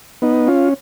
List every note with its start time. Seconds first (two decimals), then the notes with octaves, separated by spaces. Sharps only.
0.22 B3 D#4
0.47 C#4 F4